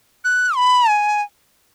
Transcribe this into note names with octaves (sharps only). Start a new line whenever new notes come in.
F#6
B5
G#5